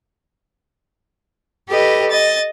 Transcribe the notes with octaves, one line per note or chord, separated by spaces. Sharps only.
G4 A4 B4 D#5
D#5 A6